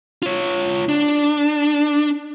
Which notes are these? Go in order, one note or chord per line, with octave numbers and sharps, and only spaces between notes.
F4 C#5
D4